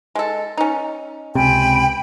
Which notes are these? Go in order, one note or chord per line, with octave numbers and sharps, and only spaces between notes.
G#3 A4
C#4 D#4
C#2 C3 G5 G#5 B5